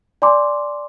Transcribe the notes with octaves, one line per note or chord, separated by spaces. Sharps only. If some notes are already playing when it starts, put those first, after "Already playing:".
D5 G#5 A#5 C6 D6